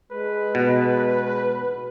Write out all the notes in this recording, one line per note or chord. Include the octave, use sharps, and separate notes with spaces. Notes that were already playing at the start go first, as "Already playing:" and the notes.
G#3 B4
B2